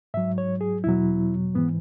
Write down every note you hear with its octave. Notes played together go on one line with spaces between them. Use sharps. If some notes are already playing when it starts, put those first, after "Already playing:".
G#2 F#3 E5
C#5
G#4
E2 B2 F#3 E4
G#2 E3 B3